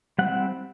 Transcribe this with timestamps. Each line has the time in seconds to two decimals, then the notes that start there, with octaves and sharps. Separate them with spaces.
0.18 G3 C4 E4 F#5